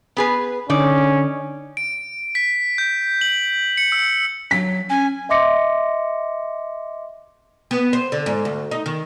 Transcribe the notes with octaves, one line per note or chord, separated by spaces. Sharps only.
B3 G#4 B4
D3 C#4 D#4 D5
D7
B6
G6
F#7
C#7
E6
F#3 B6
C#4 G#5
D#5 E5 C6 D6 A#6 C#7
B3
C5
D3
G#2
D2
D#4
D#3